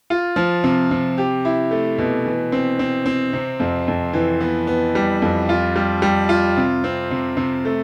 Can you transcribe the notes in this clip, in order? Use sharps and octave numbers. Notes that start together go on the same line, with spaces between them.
F4
F3
C3
C3
G4
E4
A3
B2
E3
C4
C4
C4
C3
F2
F2
E3
B3
B3
G3
F2
F4
G3
G3
F4
C3
C4
C3
C3
A3